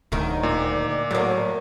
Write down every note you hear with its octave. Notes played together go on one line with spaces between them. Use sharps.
D1 D2 D#3
A#2 D5
A2 F#3 A#3